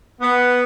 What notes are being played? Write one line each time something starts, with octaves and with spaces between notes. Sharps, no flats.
B3